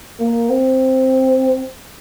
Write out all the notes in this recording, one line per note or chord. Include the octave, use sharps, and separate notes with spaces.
A#3
C4